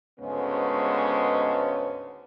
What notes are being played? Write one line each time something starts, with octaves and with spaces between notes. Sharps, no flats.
D2 G#2 C#3 G#3 B3